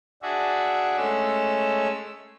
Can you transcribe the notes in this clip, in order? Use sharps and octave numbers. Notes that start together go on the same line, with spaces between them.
D4 F#4 G#4 E5
G#3 A3 C#4 E6